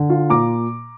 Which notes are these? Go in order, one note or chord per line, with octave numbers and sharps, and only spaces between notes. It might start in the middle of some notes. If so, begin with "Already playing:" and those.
Already playing: D3
F4
A#2 A#5 D6